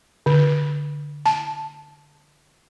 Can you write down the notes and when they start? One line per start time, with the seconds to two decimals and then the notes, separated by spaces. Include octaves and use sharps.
0.26 D3
1.26 A5